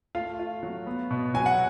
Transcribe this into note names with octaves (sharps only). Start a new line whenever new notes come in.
A3 F4 F5
F4
F#3
B3
B2
F#3 G#5
F#5